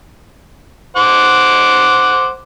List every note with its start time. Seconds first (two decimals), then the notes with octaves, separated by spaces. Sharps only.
0.97 C5 F#5 D6